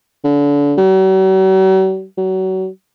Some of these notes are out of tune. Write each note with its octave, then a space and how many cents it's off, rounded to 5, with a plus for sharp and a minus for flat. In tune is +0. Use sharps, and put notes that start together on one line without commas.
D3 -35
F#3 +45
F#3 +30